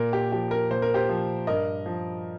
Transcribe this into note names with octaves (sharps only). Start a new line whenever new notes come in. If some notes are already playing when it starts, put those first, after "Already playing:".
Already playing: A#2 A#4
G4
F3 G4
A#4
A#2 C5
A#4
G4 C5
F3
G2 A#4 D#5
F3